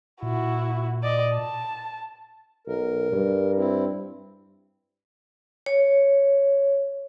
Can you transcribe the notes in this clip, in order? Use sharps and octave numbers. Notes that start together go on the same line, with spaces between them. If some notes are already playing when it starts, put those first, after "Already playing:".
A#2 E4 F#4
D5 D#5
A5
B1 A#4
G2
C4 E4
C#5